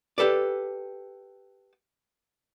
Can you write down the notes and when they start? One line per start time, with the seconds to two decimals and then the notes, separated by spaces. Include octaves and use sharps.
0.18 G4 A4 B4 D5